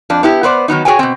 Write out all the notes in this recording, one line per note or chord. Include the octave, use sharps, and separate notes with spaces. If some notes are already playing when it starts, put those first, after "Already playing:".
F2 D4
B3 E4 G4
B3 B4 C5 D5
D#3 F#3 B3 D#4
F#4 G#4 A4 C#5 G5 G#5
B2 C4